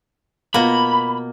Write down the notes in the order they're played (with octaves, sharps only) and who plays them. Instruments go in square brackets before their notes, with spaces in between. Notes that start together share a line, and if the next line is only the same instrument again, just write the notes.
[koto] B2 A#3 [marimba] B3 F4 [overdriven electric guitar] B5